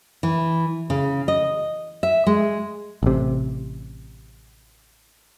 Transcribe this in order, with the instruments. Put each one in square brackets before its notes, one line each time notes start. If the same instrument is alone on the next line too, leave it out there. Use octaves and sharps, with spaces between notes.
[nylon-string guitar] E3
C#3
D#5
E5
G#3
[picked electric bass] A1 C3